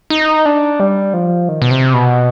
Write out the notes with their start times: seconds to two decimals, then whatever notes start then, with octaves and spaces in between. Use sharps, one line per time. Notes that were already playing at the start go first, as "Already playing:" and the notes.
0.10 D#4
0.46 D4
0.80 G3
1.13 F3
1.49 D#3
1.62 B2
1.71 C3
1.94 B2